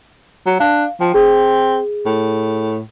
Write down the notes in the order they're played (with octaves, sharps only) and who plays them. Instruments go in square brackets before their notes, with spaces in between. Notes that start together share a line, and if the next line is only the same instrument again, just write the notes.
[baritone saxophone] F#3
[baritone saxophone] D4 [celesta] F5
[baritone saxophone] F3 [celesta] G5
[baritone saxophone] C4 [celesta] G#4
[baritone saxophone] A2